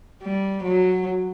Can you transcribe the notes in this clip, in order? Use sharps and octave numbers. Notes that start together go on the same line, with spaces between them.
G3
F#3